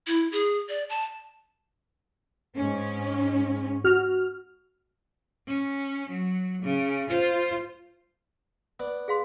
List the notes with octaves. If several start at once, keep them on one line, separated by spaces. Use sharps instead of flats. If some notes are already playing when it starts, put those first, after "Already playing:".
E4
G#4
D5
A5
G#2 C#4
F#4 F6
C#4
F#3
C#3
F4 C5
B3 D5
G#4 F5 C6